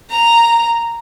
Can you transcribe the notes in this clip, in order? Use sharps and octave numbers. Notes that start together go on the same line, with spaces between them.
A#5